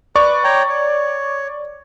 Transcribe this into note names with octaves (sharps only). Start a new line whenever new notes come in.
B4 D5 C#6
C#5 G5 A#5
C#5